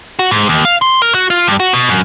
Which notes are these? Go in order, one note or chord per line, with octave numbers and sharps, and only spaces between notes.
F#4
G#2
D#2
F5
C6
A#4
F#4
F4
G2
F#4
B2
F#2